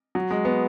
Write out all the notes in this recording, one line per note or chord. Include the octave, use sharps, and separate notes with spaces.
F#3
G#3
B3